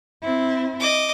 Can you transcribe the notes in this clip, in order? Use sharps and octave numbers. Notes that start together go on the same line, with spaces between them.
C4 E4
D#5 D6